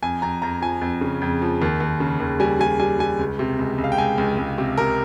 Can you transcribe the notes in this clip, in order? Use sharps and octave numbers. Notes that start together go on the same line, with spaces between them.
F2 G#5
F2 A#5
F2 A#5
F3 G#5
F2
C#3
F2
F3
D#2
D#2
C#3
D#2
G3 G#5
G3 G#5
G3 G#5
G3 G#5
C#2
C3
C#2
C#2
F5
G5
C#2 G#5
C#2
C#2
C3
C3 A#4